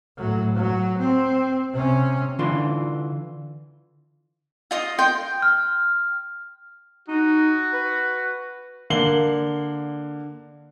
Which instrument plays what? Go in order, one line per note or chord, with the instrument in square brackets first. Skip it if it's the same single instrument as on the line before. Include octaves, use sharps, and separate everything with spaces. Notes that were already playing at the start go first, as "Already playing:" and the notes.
[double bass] A2 F#3
F#3
C4
C3 C#4
[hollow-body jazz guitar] D3 E3 D4 F4 C6
[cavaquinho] F4 D#5 D#6
G5 C6
[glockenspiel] F6
[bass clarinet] D#4 [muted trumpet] F#4
[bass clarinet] B4
[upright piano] D3 A#3 C7 F#7 G7